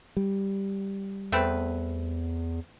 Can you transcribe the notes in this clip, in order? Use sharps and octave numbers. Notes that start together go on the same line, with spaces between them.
G3
E2 A3 C4 B4